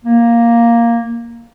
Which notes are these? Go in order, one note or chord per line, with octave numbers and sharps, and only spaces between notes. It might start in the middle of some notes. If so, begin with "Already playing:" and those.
A#3